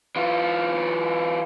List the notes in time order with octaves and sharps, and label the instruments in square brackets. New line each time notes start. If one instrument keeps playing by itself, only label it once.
[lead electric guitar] E3 F4